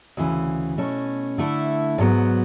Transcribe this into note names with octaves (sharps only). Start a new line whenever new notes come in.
D2 C#3 E3
B2 A3 C#4
D3 A3 E4
G#2 F#3 B3